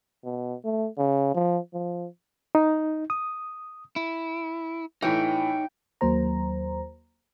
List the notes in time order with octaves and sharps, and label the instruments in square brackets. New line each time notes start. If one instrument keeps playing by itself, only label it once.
[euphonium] B2
A3
C#3
F3
F3
[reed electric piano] D#4
D#6
[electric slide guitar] E4
[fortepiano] A2 E3 [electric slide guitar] D#4 C#5 [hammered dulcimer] G5
[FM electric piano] D#2 F#3 A#3 C5 A#5